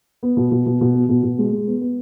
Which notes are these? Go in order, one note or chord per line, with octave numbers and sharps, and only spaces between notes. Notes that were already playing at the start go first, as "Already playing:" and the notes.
B3
B2
B2
B2
B2
B3
B2
B2
G#3
G#3
B3
B3